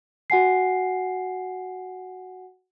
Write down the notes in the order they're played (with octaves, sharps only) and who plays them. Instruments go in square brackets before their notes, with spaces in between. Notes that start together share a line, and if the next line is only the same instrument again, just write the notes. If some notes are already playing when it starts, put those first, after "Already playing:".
[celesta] F#4 F#5 G#5 C7